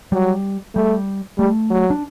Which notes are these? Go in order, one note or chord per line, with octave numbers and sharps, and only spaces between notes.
F#3 G3
G3 A3
G3 A3
F#3
D4